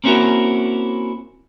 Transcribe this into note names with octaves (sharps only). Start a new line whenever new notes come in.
A#3 C4 C#4 E4 F#4 A#4